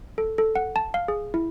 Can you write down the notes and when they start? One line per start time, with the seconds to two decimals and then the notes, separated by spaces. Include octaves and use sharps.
0.18 A4
0.38 A4
0.55 F#5
0.76 A5
0.94 F5
1.08 G#4
1.34 E4